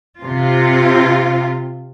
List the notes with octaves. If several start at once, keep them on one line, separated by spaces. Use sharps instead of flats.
C3 F4